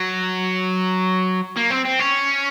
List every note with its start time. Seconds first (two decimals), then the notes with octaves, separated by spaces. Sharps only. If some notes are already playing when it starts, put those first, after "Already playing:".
Already playing: F#3
1.57 A#3
1.71 C4
1.85 C4
2.00 C#4